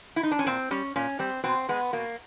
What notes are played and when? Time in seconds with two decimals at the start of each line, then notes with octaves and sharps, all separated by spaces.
0.16 E4
0.23 D#4
0.31 D4
0.39 C#4
0.46 A#2 C4
0.71 G3 C#4
0.96 A#2 C#4
1.19 G3 C4
1.44 B2 C4
1.69 G#3 B3
1.93 B2 A#3